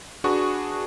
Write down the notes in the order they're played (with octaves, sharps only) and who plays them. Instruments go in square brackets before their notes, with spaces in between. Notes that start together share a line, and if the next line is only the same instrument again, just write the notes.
[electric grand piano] D4 F#4 G#4 B4 G#5 C#6